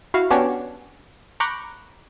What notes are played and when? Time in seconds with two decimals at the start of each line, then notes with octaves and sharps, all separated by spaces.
0.14 E4 F#4 F5
0.31 B3 C#4 D4 F#4 G4 C#5
1.40 A#5 B5 C#6 D6 F#6 G6